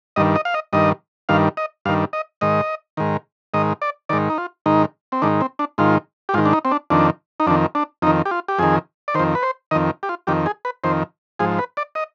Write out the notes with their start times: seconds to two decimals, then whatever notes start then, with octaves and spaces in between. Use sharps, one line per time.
0.16 G2 D#3 D#5
0.36 D#5
0.45 F5
0.54 D#5
0.73 G2 D#3 D#5
1.29 G2 D#3 F5
1.57 D#5
1.85 G2 D#3 F5
2.13 D#5
2.41 G#2 D#3 D#5
2.97 G#2 D#3
3.54 G#2 D#3 D#5
3.82 D5
4.09 G#2 D#3 D5
4.30 D#4
4.38 F4
4.66 G#2 D#3 D#4
5.12 C4
5.22 G#2 D#3 D4
5.41 C4
5.59 D4
5.78 G#2 D#3 F4
6.29 G4
6.34 G#2 F4
6.38 D#3
6.46 D4
6.53 D#4
6.65 C4
6.72 D4
6.90 F2 D#3 D4
7.40 D#4
7.47 F2 D#3 D4
7.75 D4
8.02 F2 D#4
8.07 D#3
8.25 G4
8.31 F4
8.48 G4
8.59 F2 D#3 G#4
9.08 D5
9.15 D#3 C5
9.20 F2
9.35 B4
9.43 C5
9.71 F2 D#3 D#5
10.03 G4
10.09 F4
10.27 F2 D#3 G4
10.46 G#4
10.65 B4
10.84 F2 D#3 C5
11.39 G#2 F3 G#4
11.59 B4
11.77 D5
11.95 D#5